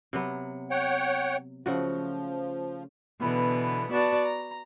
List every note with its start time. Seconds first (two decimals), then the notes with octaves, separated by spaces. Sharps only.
0.13 C3 F#3 B3
0.70 C#5 F#5 G5
1.66 C#3 F3 A3 F#4
3.20 B2 D3 E3 B3
3.91 B3 F#4 D5 A5
4.25 A#5